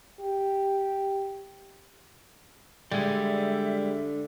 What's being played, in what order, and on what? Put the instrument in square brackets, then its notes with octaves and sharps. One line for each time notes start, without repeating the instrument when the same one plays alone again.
[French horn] G4
[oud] D3 [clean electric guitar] G3 G#3 [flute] E5